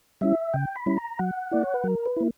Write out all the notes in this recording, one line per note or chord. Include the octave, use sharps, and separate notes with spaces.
G3 C#4 E4 E5
C#3 G5
B5
G3 C#4 E4
A#5
F#3 F#5
A#3 E4 D5
C#5
B4
F#3 A#4
B4
A#3 E4